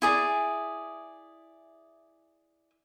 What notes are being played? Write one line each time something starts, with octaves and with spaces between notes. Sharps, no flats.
E4 G#4 D5